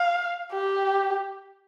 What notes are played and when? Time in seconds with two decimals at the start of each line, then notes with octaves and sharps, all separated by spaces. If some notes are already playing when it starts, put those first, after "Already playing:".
Already playing: F5
0.52 G4